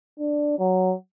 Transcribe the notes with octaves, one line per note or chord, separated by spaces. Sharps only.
D4
F#3